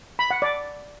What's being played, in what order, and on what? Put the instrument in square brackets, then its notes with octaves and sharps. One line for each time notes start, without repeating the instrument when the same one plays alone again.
[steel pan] B5
F#5
D5